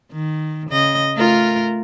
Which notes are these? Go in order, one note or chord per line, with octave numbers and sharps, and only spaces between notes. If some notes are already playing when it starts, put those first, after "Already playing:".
D#3
C#3 D#5
A3 F4 A#4